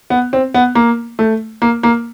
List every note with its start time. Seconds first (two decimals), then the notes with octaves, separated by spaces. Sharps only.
0.10 B3
0.33 C4
0.54 B3
0.75 A#3
1.19 A3
1.62 A#3
1.83 A#3